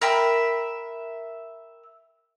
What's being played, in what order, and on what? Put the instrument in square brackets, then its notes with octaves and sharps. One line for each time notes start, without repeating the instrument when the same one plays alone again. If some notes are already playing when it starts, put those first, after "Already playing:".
[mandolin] A#4 E5 G5 B5